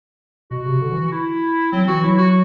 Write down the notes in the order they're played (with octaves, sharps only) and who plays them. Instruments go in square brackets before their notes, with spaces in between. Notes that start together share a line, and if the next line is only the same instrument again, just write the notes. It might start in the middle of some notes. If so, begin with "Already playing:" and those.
[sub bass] B2 [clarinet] F#4
[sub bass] C3
D3
E3
[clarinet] E4
[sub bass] F#3 [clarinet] C4
[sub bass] E3 [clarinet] F#4
[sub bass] F#3 [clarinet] E4
[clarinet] F#4